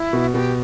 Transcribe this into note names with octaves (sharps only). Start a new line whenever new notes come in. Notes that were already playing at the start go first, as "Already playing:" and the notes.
Already playing: E4
B2
B2 G4